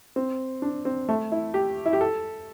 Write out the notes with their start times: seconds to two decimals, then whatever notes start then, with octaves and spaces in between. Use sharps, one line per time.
0.16 C4
0.62 D4
0.85 C4
1.09 A3
1.32 E4
1.54 G4
1.86 E4
1.93 G4
2.01 A4